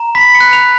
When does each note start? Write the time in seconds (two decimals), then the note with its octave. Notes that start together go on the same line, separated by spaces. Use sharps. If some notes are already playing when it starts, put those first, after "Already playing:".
Already playing: A#5
0.15 B5 B6
0.35 C#7
0.40 F#6
0.53 F7